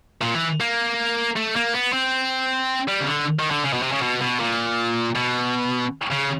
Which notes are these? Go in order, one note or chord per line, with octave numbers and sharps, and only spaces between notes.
A#2
E3
A#3
A3
A#3
B3
C4
G3
C#3
D3
D#3
D3
C#3
B2
C3
C#3
B2
B2
A#2
B2
C#3